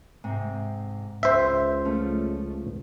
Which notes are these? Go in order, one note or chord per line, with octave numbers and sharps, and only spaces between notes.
G#2 C3
C#2 G4 B4 C5 E5
F3 A3 C#4